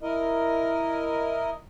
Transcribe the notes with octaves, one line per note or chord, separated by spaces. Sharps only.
E4 A#4 D#5